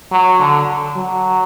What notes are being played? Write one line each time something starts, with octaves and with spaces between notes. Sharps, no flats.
F#3
D3
F#3